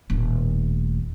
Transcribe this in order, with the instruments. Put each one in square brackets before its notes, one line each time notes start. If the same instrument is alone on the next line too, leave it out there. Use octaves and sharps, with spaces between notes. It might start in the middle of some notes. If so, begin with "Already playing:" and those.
[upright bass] D#1 A2